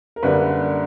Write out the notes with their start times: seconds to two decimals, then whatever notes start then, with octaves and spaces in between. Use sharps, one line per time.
0.16 A#4
0.23 F#2 D3 G3 A#3 B4